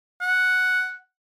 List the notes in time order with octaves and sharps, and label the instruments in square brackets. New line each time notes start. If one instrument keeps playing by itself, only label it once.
[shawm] F#5